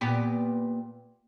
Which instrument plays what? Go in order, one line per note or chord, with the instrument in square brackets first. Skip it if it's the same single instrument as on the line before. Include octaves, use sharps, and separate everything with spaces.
[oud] A#2 B3 G4